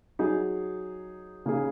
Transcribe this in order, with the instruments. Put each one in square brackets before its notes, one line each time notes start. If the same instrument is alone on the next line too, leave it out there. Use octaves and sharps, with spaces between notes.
[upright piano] F#3 D#4 G#4
C#3 A#3 D#4 G#4